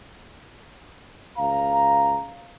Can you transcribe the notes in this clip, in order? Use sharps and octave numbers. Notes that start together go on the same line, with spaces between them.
C#2 F5 A#5